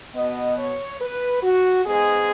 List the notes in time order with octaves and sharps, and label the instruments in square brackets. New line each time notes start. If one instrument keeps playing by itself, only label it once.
[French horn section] B2 B3 D#5
C#5
B4
F#4
G#2 G#3 B3 G#4